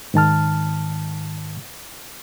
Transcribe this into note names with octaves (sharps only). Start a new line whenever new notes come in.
G#2 D#3 A5 F6